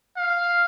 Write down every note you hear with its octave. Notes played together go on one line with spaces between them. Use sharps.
F5